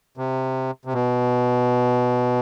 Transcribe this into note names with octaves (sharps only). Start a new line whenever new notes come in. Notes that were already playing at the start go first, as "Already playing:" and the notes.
C3
C3
B2